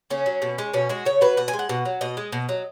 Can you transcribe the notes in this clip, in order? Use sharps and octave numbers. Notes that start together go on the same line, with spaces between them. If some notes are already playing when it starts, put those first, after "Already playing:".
C#3 C#4
F#3
B2
G#3
B2 C#4
G#3 F#4
C#3 C#5
F#3 B4
B2 F#5
G#5
G#3
F#5
B2
F#3
B2 D#5
G#3
B2
F#3